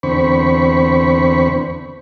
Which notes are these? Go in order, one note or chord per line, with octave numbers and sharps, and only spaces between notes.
E2 D3 C4 C5 B5 C#6